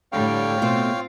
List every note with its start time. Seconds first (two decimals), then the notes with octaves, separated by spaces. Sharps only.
0.12 A2 D3 G3 C#5 F5 G5
0.62 B2 A3 C4 F4